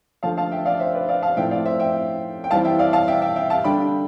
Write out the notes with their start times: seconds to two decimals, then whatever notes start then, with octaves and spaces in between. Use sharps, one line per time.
0.23 D3 F3 A3 F5 A5
0.37 F5 A5
0.51 E5 G5
0.66 D5 F5
0.80 C5 E5
0.95 B4 D5
1.08 D5 F5
1.22 F5 A5
1.37 A2 F3 C4 E4 E5 G5
1.51 D5 F5
1.65 C5 E5
1.79 E5 G5
2.44 G5
2.51 E3 G3 C4 E4 F5 A5
2.65 E5 G5
2.79 D5 F5
2.93 F5 A5
3.08 E5 G5
3.22 E5 G5
3.36 E5 G5
3.50 F5 A5
3.64 D3 G3 D4 G5 B5